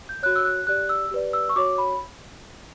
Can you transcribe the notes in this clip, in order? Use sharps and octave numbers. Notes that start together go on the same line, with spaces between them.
G6
F#4 C#5 F#6
E6
F#6
G4 D5 F#6
E6
G4 B4 D5
E6
C#6
F#4 C#5 D6
B5